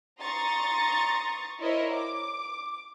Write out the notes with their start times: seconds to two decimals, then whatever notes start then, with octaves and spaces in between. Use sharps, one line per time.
0.20 A#5 C6 C#6 D#6 A6
1.62 E4 A#4 C5 C#5 D#5
1.95 D6